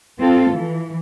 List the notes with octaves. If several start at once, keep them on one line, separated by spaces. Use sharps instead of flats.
C4 F4 A4
E3